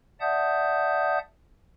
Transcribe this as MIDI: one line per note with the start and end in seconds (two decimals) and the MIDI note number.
0.21 1.19 74
0.21 1.19 76
0.21 1.19 78
0.21 1.19 81
0.21 1.19 87
0.21 1.19 91